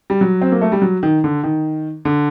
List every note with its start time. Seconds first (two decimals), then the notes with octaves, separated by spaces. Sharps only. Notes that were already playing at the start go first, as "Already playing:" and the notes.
0.10 G3
0.21 F#3
0.41 C4
0.52 A#3
0.61 A3
0.72 G3
0.82 F#3
1.03 D#3
1.24 D3
1.43 D#3
2.05 D3